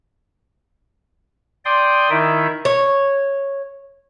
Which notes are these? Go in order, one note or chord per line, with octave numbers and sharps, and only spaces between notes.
D5 G5 C6 D#6
D#3 D#4 E4 E5
C#5